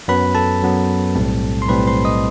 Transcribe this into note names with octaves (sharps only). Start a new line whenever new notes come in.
F#2 F#3 B3 B4 B5
A4 A5
F#2 F#3 B3
B1 A2 G3 C4
C6
B1 A2 G3 C4 B4 B5
C5 C6
D#5 D#6